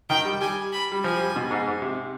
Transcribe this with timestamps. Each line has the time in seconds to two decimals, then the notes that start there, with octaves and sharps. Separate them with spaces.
0.10 D#3 G5
0.25 G3
0.41 G3 G#5
0.73 B5
0.92 G3
1.04 F3 G#5
1.19 G3
1.36 B2
1.51 G#2
1.67 G#2
1.82 C3